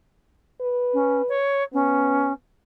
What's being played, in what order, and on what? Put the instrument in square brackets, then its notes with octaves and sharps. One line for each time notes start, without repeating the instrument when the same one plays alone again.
[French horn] B4
[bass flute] C#4
C#5
[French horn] B3 [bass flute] C#4